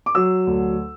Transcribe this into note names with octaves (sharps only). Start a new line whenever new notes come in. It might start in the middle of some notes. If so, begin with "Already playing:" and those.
D6
F#3 E6
D2